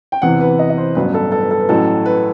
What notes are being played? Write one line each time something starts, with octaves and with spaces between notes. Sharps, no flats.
G5
E2 C3 E3 F#5
B4
D#5
D#5
C5
A1 G2 F#3 B3 B4
A4
A4
B4
A4
B4
A1 A2 F#3 A4
B4